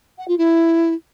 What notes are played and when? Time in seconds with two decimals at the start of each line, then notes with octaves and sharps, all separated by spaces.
0.18 F#5
0.28 F4
0.37 E4